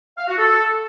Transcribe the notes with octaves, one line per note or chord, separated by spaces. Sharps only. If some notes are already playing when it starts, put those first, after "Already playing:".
F5
F#4
A4